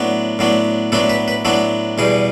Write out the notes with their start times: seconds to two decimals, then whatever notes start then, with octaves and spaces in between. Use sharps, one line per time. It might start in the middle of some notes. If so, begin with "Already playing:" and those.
Already playing: A2 F#3 B3 D4
0.39 A2 F#3 B3 D4
0.92 A2 F#3 B3 D4 A4
1.09 B4
1.28 B4
1.45 A2 F#3 B3 D4 A4
1.98 E2 B2 G3 G#4